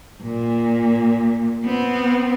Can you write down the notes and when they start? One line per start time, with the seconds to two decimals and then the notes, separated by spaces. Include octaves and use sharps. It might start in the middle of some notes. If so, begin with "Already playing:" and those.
0.22 A#2
1.65 B3 C4